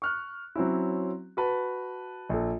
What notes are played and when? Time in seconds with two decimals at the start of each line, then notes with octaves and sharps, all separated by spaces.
0.02 C#6 F6 F#6
0.55 F#3 C4 C#4 E4
1.37 F#4 B4 A5
2.29 A#1 A4